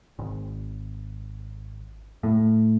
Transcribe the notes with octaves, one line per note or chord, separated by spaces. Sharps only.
G#1
A2